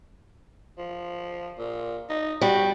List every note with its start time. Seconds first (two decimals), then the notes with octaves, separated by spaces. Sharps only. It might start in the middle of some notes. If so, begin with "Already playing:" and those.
0.78 F3
1.58 A#2
2.09 D#4
2.41 G3 F#4